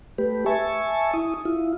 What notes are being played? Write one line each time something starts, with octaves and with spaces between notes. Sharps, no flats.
A3 G4 B4
E5 G#5 A5 C#6
E4 D#6
E4 F4